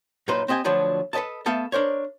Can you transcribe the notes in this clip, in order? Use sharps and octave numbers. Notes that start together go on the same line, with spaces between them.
F#2 A#2 D#4 B4 C5
C4 G4 D#5 F#5 G#5
D2 F3 F#3 D4 B4
A4 B4 D5 D#5 A5
A3 B3 A4 E5 F5
D4 A#4 C5 C#5